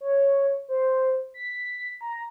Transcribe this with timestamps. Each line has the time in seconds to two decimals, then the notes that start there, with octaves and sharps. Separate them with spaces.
0.01 C#5
0.69 C5
1.34 B6
2.01 A#5